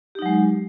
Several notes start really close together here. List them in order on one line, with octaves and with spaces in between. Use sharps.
G4 D#4 F#3 G#3